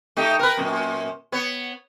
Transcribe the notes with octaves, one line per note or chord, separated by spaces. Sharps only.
A3 D#4 G4
A#4 B4
F#2 A#2
B3 C#5